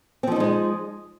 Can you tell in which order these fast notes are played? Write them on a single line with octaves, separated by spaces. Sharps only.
C4 F3 D#4 G3 G#3